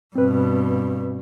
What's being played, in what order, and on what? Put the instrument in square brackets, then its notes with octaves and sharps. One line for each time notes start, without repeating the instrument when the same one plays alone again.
[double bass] G2 B2 [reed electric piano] C4 B4